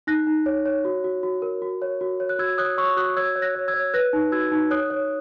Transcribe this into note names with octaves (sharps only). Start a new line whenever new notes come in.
D#4 F#6 A#6
D#4
C#5
C#5
F#4
F#4
F#4
A#4
F#4
C#5
F#4
C#5
F#6
F#4 E6 G#6
C#5 D#6 F#6
C#5 C#6 E6
F#4 D#6 F#6
C#5 E6 G#6
C#5
F#6 A#6
C#5
E6 G#6
C#5
B4 F#6 A#6
D#4
F#4 E6 G#6
D#4
C#5 D#6 F#6
C#5